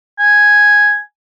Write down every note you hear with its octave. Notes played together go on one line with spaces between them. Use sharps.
G#5